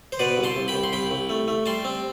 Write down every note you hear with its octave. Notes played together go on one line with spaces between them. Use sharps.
C5
B2 B4 D5
C2
A5 C6
C2
G5 B5
C2
C6
C2 G5 B5
C2
A3
A3
G3 A5 C6
C4